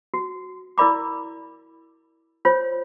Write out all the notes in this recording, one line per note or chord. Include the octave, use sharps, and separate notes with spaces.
F#4
E4 A#4 D5 B5 D6
F4 C5 C#5